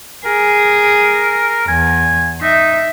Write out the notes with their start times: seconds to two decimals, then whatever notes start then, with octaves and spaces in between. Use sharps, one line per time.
0.25 G#4 A#4
1.69 E2 G#5
2.42 D#4 E5